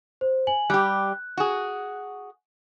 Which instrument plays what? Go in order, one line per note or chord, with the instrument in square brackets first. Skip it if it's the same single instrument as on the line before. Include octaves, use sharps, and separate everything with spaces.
[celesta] C5
G#5 F#7
[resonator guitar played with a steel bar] G3 G4 [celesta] F#6
[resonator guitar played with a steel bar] F#4 G#4